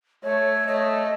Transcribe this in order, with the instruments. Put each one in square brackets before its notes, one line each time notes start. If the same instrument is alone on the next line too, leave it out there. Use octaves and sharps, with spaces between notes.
[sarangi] A3 [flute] C#5
[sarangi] A3 [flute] D#5